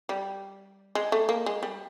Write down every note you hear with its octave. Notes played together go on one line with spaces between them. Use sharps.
G3
G#3
A3
A#3
G#3
G3